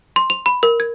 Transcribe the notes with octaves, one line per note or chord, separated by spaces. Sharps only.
C6
F7
B5
A#4
G#6